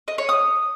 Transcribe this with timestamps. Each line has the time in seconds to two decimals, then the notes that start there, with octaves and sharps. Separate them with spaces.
0.08 D#5
0.18 C#5
0.29 D#6